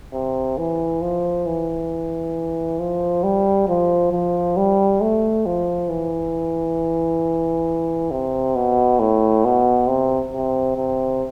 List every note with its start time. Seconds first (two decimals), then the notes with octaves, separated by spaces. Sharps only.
0.13 C3
0.58 E3
1.02 F3
1.46 E3
2.79 F3
3.23 G3
3.68 F3
4.12 F3
4.57 G3
5.01 A3
5.46 F3
5.89 E3
8.11 C3
8.55 B2
8.99 A2
9.44 B2
9.88 C3
10.33 C3
10.77 C3